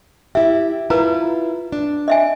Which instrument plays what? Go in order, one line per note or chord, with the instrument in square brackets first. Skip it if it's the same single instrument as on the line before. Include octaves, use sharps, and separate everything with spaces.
[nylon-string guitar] E4 G4 [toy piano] E5
[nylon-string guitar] E4 F4 [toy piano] B4 A#5
[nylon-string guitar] D4
[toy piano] D#5 E5 G#5